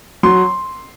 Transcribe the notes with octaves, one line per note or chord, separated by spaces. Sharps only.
F#3 C6